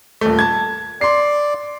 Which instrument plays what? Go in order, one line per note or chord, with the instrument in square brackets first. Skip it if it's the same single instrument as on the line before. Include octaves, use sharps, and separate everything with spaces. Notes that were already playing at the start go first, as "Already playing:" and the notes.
[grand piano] D#1 A3
A5 G#6
[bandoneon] D5 [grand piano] C6 C7